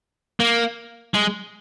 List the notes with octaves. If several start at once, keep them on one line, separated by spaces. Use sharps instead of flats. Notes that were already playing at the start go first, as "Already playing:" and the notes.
A#3
G#3